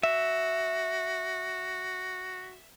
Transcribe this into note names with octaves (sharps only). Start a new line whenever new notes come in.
F#4 E5